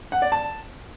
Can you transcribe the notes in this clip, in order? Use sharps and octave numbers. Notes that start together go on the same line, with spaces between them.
F#5
D5
A5